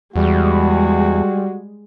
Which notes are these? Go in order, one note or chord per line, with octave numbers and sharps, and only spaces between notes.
E2 G3 G#3 F#4